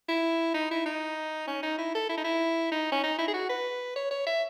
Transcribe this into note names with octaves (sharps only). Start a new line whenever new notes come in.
E4
D#4
E4
D#4
C#4
D#4
E4
A4
E4
D#4
E4
D#4
C#4
D#4
E4
G#4
F#4
B4
C#5
C#5
E5